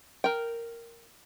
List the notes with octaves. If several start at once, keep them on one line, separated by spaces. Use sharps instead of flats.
A#4 G5